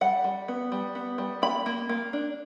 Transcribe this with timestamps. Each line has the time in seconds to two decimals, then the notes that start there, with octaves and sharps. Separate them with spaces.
0.01 G3 F#5
0.24 G3
0.48 B3
0.72 G3
0.95 B3
1.18 G3
1.42 A#3 B5
1.66 A#3
1.89 A#3
2.13 D4